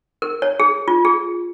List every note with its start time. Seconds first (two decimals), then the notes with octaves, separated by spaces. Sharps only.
0.22 A#4
0.42 C#5
0.60 G#4
0.88 F4
1.05 G#4